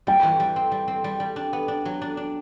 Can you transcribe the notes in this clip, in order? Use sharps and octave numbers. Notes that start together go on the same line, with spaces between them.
G3 G5
E3
G3
C4
G3
C4
G3
G3
D4
B3
D4
F#3
D4
D4